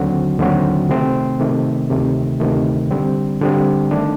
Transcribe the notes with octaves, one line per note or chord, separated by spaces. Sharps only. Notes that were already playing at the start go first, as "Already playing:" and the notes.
Already playing: D#2 D3 F#3 C4 F#4
D#2 D3 F#3 C4 F#4
C3 D#3 A3 C4
C3 D#3 A3 C4
D2 C3 D#3 A3
D2 C3 D#3 A3
D3 G3 C4
D3 G3 C4
D#3 A3 D4